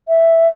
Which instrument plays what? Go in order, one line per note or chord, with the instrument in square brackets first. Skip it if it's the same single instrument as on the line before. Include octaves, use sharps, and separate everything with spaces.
[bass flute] E5